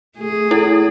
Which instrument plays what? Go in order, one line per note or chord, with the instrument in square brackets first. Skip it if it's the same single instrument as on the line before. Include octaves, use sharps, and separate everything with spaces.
[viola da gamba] A3 G#4
[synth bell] E4 A4